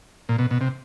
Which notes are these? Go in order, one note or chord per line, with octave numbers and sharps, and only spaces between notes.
A#2
B2
B2
C3